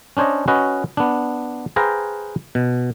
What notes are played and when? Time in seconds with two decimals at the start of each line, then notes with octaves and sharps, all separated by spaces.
0.17 C#4 D4 C5 C#5 D#5
0.48 C#4 F#4 B4 D#5
0.97 B3 D4
1.76 G#4 B4 C5 F5 G5 A#5
2.55 B2